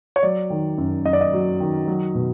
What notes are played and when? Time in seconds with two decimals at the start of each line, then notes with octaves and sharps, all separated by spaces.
0.16 C#5
0.23 F#3 D5
0.50 D#3
0.78 F#2
1.05 F#2 D#5
1.13 D5
1.21 D#5
1.33 F#3
1.60 D#3
1.88 F#3
2.15 B2